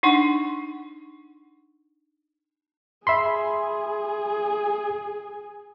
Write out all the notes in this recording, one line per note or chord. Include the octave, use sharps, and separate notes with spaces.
D4 D#4 F#5 C6 C#6
G#4 E5 B5 C6